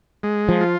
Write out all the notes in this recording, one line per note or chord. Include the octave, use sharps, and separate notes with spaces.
G#3
F3
F4